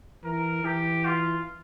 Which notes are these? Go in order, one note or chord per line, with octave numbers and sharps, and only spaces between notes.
E3 A#4
E3 G4
F4